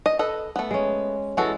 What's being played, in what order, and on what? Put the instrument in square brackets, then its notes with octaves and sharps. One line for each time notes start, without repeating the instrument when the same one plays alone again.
[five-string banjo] D#5
A4 B4 D#5
A3 B3
[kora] G#3 C#4
[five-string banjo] E3 F#4 A4 [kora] G#3